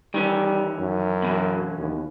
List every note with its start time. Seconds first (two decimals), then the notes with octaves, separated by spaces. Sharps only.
0.14 D#3 E3 G3 C#4
0.80 F#2
1.22 B2 E3 F#3
1.79 D#2